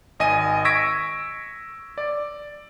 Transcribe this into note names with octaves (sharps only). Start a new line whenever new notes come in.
G#1 D#5 G#5 D#7
C#6 E6 G#6 A#6 B6 D7
D5